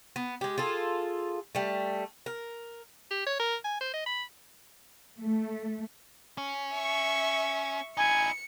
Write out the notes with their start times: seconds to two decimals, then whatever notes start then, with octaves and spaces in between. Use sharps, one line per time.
0.16 B3
0.41 G#3 G4
0.58 F4 G#4 A4
1.55 G3 A3
2.26 A#4
3.11 G4
3.26 C#5
3.40 A#4
3.64 G#5
3.81 C5
3.93 D#5
4.06 B5
5.21 A3
6.38 C#4
6.74 E5 C#6
7.97 D#4 E4 G#5 C#7